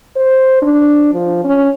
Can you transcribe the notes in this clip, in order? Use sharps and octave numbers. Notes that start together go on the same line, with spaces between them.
C5
D4
F3
C#4